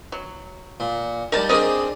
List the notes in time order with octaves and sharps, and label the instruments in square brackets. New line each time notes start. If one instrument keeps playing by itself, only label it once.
[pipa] F#3
[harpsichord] A#2
[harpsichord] G3 D#4 [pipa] A#4 A5
[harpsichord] C4 D4 G#4 [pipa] A#4 D#5